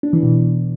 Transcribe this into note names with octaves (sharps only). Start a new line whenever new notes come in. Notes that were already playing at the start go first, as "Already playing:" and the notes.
D4
E3
B2